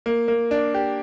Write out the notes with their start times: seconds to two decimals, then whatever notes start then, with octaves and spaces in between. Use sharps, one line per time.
0.06 A#3
0.28 A#3
0.51 D4
0.74 G4